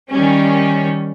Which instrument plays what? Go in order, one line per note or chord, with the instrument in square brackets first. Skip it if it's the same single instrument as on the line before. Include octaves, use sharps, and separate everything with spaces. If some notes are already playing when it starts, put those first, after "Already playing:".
[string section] D#3 G3 C#4